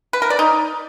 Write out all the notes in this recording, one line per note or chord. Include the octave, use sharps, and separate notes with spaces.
B4
A#4
D5
D#4